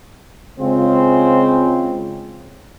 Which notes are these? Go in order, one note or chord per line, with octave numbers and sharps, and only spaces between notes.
C#3 G#3 C4 F4